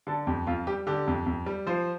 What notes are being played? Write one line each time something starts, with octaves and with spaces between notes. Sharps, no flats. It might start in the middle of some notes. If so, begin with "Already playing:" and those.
D3 A4
F2 G4
F2 F4
G3 G4
D3 G4
F2
F2
G3
F3 C5